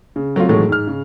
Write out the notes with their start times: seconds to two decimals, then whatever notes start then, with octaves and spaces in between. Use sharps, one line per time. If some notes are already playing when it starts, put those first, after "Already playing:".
0.16 C#3
0.36 F#3 A3 C4 F4
0.49 A2 D#3 E3 F#3 G#3 A3
0.69 G#2 F6
0.87 C#3